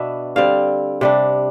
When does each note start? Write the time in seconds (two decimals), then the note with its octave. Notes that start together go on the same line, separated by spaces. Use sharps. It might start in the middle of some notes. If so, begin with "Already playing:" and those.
Already playing: B2 B3 D4 E5
0.36 D3 G3 C4 F5
1.01 C3 G3 D4